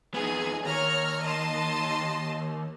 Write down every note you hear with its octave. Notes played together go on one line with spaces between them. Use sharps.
F2 B3 D#4 G#4
D#2 D#3 C#5 A#5 F6
D#5 A5 C6